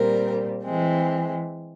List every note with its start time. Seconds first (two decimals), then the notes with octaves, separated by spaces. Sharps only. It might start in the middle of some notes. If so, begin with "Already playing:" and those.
Already playing: A#2 G3 C4 A#4
0.64 E3 G#3 C4